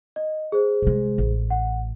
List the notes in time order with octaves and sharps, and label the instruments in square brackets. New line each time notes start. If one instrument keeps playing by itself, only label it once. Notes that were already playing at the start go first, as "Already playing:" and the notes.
[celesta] D#5
G#4 C5
[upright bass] C3 G#3
A1
[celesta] F#5